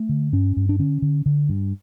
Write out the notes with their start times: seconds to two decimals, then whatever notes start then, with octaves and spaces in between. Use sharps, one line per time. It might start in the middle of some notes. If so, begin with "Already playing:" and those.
Already playing: A3
0.09 D3
0.33 G2 C#4
0.57 G2
0.69 D4
0.79 D3 C#4
1.02 D3
1.26 D3
1.49 G2